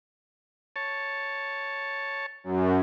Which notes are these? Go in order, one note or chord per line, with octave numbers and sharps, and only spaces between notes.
C#5 A5
F#2